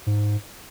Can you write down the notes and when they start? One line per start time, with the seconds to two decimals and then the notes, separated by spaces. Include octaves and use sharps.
0.07 G#2